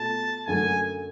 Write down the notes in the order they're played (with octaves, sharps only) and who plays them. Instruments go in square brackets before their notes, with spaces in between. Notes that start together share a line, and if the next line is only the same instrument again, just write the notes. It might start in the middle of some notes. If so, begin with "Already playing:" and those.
Already playing: [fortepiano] B2 A3 F4 [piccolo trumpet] A5
[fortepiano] F#2 D3 F#3 A3 [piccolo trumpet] G#5